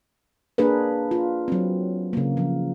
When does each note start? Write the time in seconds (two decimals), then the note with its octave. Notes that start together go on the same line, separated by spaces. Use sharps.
0.58 A#3 D4 G#4 A#4 B4
1.11 F4
1.48 F#3 C4
2.13 C#3 A#3
2.37 F3